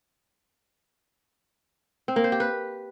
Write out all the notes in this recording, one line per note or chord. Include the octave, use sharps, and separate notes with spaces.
C4
A#3
C5
G4
B4